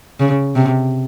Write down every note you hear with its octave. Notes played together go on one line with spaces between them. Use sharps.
C#3
C3